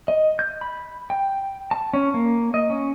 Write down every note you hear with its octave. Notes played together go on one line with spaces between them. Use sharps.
D#5
G6
B5
G5
A5
C#4
A#3
D#5
C#4